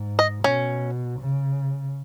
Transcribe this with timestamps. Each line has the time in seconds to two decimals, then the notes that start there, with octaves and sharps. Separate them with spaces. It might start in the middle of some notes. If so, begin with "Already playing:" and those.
Already playing: G#2
0.19 D#5
0.44 B2 C#4
1.20 C#3